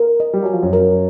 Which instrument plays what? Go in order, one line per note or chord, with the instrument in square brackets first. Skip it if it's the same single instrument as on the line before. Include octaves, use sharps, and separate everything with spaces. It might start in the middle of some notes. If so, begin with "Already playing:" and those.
Already playing: [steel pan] A#4
D#5
[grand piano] G3
[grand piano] F#3 [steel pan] G#5
[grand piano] F3
F#2 F#3
[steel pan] A#4